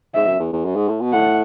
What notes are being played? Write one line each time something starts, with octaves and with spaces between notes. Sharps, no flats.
G#2 E5
F#2
E2
E2
F#2
G#2
A2
B2
A2 F#5